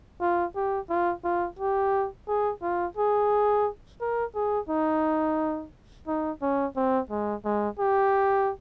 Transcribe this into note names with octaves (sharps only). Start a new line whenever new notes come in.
F4
G4
F4
F4
G4
G#4
F4
G#4
A#4
G#4
D#4
D#4
C#4
C4
G#3
G#3
G4